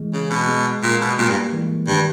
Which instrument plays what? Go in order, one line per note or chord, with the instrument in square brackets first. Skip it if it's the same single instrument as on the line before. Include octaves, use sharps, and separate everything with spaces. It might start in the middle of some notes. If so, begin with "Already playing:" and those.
Already playing: [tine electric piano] E3 G#3
[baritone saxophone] C#3
B2
[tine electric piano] G#3 B3
[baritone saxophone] A#2
B2
[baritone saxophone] A#2 [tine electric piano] G3 A#3
[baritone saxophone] G2
[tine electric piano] E3 G#3
[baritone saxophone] G2 [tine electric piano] D#3